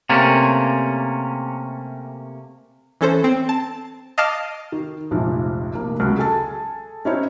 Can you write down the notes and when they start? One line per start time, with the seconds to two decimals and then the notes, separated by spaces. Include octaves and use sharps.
0.10 C3 A3 A#3 C#4
3.01 E3 C#4 A4 C5
3.24 C4
3.49 A5
4.18 D#5 F5 A5 D6 F6
4.72 D#3
5.11 F1 A#1 G#2 F3
5.75 F1 A#3
6.00 C#2 F#3
6.17 G#4 A4 G#5 A5
7.05 C#4 D#4 E4 C5 C#5